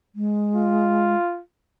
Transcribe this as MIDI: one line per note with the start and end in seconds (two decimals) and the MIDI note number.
0.15 1.15 56
0.55 1.41 65